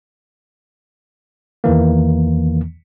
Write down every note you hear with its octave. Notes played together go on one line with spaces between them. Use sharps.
E2 D#3 E3 A#3